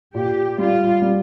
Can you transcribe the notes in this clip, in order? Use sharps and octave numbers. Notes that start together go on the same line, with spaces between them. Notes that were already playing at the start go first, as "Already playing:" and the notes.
A#2 G4
G3 F4
G3